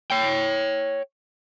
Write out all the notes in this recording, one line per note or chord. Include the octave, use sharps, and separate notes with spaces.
C#5 G5